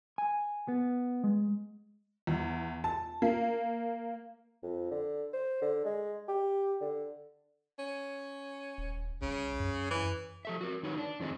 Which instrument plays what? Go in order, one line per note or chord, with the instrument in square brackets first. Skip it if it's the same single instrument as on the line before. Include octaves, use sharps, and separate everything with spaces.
[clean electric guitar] G#5
B3
G#3
[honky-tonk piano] E2
A5
A#3
[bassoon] F2
D3
C5
D3
G#3
G4
D3
[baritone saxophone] C#4
[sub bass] D#1
[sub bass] C2 [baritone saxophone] C#3
[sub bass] F#2
[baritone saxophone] E3
[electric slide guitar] F3 A4 E5
F#4 A#4
D#3 D#4 B4 C#5
D4
F2 D#3 C4 G#4 D#5